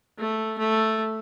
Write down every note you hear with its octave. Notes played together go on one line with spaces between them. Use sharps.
A3
A3